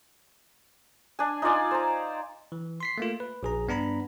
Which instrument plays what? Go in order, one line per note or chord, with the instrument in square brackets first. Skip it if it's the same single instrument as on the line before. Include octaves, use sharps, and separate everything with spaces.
[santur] D4 G#5
D#4 F4 D5 G#5
C5 A#5
[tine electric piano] E3
C6 B6 C7
A3 A#3 F4
B4
A#1 G#4 A#5
G2 B3 D4 A#5 B5